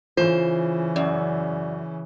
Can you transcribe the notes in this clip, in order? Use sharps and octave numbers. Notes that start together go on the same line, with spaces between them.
C#3 E3 F4 C5
F#2 D5